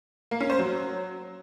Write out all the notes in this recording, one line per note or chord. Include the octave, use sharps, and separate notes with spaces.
A#3
C#4
C5
F#3